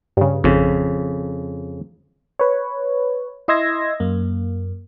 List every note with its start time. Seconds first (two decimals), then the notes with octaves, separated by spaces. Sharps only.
0.17 G2 C#3
0.44 G#1 F2 C#3
2.39 B4 C#5
3.48 E4 D#5 C6 E6 G#6 A#6
4.00 F#2 A#3